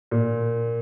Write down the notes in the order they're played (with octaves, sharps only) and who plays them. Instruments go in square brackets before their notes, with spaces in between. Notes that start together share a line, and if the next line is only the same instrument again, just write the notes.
[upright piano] A#2